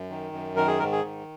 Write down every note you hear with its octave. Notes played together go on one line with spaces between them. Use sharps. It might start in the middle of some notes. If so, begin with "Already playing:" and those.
Already playing: F#2
D#3
F#2
D#3 A#4
G#4
G#2 A#4
G#4
D#3